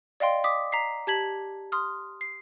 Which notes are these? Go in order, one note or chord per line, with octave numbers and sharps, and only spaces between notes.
D5 D#5 F5 G5 C6
D6 D#6 B6
A#5 B6 C7
G4 A5 G#6 B6 F#7
C6 D#6 F6
C7